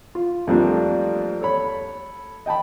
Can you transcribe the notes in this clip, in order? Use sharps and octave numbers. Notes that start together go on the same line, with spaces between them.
F4
F2 F3 G3 A3 A#3 D4
A4 C#5 B5
D#5 G5 A5 B5